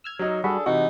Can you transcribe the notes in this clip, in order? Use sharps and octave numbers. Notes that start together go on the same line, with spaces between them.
E6 F6 G#6
F#3 D#4
G3 D4 F#4 G#4 A4 B5
C3 E3 D#4 F#4 F#5